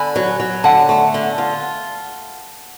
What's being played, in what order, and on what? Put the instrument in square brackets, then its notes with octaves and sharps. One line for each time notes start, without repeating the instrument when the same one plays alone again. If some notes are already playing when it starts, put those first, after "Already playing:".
Already playing: [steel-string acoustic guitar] D3 [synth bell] G#5 B5
[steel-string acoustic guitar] F#3
F#3
[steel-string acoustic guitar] D3 [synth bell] F#5 A5
[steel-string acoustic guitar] A3
D3
F4